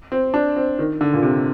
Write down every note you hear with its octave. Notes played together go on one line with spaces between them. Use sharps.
C4
D4
C4
D#3
D3
A#2
C3